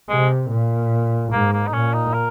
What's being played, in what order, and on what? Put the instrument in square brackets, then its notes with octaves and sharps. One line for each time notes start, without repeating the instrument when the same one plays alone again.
[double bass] C3 [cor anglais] G#3
[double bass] A#2
[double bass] G#2 [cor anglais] A#3
[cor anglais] A#3
D#4
[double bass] A#2 [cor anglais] C#4
[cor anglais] D#4
A#4